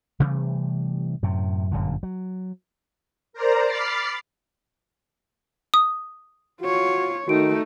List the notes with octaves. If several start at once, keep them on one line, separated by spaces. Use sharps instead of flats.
C3 E3 G3 A3
F#2 A2 C3
G1 F#2 A#2 D3
F#3
A#4 C5 D5 A#5
B5 D6 F6 A6 C7
D#6
F4 F#4 C#5
D#3 A3 D#4 F#4 D7